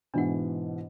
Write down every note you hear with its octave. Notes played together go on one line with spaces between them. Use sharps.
G#2 B2 E3 D4 F#5